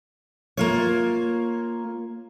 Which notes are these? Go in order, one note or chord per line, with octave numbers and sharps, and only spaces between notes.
A#3 F4 C#5